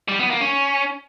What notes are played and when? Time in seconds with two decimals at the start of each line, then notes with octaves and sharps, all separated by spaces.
0.09 G3
0.19 B3
0.30 A#3
0.41 C#4